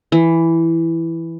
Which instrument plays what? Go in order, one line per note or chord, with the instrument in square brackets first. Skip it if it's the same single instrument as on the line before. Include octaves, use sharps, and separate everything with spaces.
[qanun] E3